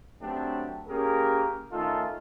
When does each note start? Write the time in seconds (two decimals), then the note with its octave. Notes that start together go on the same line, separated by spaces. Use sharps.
0.21 F#3 A3 B3 C4 D4 G4
0.88 A#3 C#4 G4 G#4 A#4
1.71 D#3 A3 C#4 D#4 F4 A4